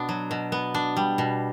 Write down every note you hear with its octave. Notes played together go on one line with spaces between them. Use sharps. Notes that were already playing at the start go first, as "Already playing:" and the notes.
Already playing: B2 B3 D4
F#3
B2
B3
D4
G3
B2